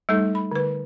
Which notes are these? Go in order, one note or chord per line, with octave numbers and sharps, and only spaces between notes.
G3 A3 D#4 A4
B5
D3 B4